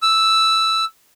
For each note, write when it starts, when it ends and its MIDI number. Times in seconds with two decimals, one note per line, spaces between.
0.03 0.85 88